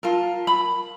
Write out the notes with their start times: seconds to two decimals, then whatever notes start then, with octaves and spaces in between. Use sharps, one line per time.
0.03 F4 A#4 A5
0.47 B5